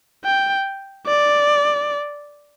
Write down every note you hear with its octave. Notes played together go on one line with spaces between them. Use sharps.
G5
D5